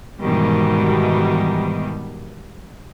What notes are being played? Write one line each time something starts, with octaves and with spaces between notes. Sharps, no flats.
G#2 B2 D#3 E3 G3